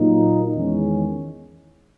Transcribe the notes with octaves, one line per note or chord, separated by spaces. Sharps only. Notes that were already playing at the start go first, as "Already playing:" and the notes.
Already playing: A#2 F#3 A#3 D#4
E2 D#3 G#3 C#4